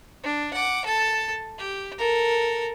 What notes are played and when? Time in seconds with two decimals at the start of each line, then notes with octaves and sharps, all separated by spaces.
0.23 D4
0.53 F#5 D6
0.85 A4 A5
1.58 G4
1.98 A4 A#4